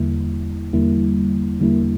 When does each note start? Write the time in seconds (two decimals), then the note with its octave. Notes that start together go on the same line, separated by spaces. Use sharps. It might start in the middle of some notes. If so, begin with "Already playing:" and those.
Already playing: E2 D3 G3 A#3 E4
0.73 E2 D3 G3 A#3 E4
1.60 E2 D3 G3 A#3 E4